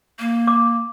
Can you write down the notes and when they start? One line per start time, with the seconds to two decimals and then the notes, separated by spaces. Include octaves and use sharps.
0.19 A#3
0.47 D6